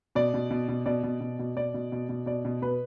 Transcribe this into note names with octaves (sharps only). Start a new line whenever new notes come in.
B2 D5
B2
B2
B2
B2 D5
B2
B2
B2
B2 D5
B2
B2
B2
B2 D5
B2
B2 B4